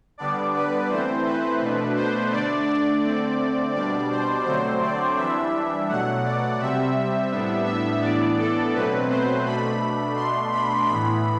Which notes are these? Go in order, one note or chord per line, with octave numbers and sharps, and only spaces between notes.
D3 G3 B3 D4 D5
B4
E3 A3 C4 C5
B4
B2 A3 D4
C5
D3 A3 D4 D5
D5
D3 A3 C4
B2 G3 D4 D5
C5
D3 F#3 A3 C4 C5
D5
E3 G3 D4 E5
B2 F#3 A3 F#5
D5
C3 G3 C4 E5
A2 G3 B3 D4
E5
A2 E3 B3 D4 D5
A4
B2 F#3 A3 C4 B4
C5
B2 A3 D4 B5
B2 A3 D4 C6
B5
A2 E3 B3 B5